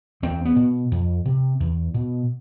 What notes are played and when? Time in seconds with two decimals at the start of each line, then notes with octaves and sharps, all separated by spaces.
0.22 E2 C4
0.45 B3
0.56 B2
0.91 F2
1.25 C3
1.60 E2
1.94 B2